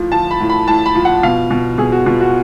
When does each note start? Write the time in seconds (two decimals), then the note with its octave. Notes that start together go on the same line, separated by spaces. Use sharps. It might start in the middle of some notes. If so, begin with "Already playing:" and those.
Already playing: A2 F3
0.12 F3 A5
0.31 B5
0.41 A2
0.50 B5
0.67 A2 A5
0.86 B5
0.95 F3
1.05 F#5
1.23 B2 F5
1.51 B2
1.78 B2 G#4
1.92 F#4
2.06 B2 F4
2.20 F#4